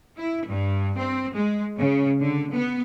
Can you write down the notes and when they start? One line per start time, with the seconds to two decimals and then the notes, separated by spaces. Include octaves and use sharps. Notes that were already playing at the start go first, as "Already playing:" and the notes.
0.18 E4
0.48 G2
0.98 C4
1.35 G#3
1.77 C#3
2.21 D3
2.53 B3